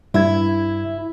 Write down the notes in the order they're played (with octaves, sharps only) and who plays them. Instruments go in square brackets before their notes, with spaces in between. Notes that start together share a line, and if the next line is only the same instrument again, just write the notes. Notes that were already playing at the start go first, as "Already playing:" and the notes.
[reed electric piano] G2 E5 G#6 [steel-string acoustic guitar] E4